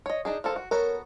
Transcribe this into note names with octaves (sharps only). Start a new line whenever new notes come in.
C#5 D#5
D4 D#4 G#4
F3 A#3 A4
F#4
B3 F#4 A4 A#4 C#5